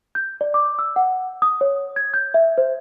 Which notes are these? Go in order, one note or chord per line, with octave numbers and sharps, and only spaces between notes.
G6
D5
D6
E6
F#5
D#6
C#5
G#6
G6
E5
C5